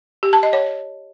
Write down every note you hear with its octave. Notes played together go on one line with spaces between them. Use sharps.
G4
A5
D#5
C#5